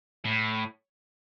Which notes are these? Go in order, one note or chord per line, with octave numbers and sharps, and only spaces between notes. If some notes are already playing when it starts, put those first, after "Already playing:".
A2